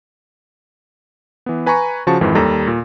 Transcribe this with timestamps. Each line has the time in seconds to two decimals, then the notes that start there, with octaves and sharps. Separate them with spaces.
1.46 E3 B3
1.66 B4 G#5 A#5 B5 C#6
2.07 C#3 F3 F#4 A5 C#6
2.21 F2 G#2 D#3 E3
2.35 D#2 G3 A4 A#5
2.67 A#2